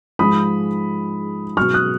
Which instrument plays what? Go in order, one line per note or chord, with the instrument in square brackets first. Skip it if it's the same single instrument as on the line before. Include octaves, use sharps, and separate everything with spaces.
[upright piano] G#2 F3 G#3 B5 D#6
B2 F#3 C#6 F6
D#6 F#6